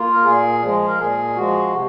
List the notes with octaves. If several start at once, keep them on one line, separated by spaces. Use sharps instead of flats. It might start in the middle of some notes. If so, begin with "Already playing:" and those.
Already playing: A#3 F4
A#4
A#2 G#4
F3 G#3
A#4
A#2 G#4
F3 G#3 F#4
C3